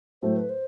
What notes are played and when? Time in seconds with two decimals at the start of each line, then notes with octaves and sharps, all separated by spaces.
0.22 A2 F#3 A3 C5
0.36 B4
0.49 C5